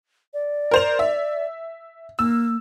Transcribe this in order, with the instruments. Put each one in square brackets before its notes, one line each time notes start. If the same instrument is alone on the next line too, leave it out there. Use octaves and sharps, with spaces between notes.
[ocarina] D5
[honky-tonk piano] A#4 C5 F7
E5
[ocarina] A#3 [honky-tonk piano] E6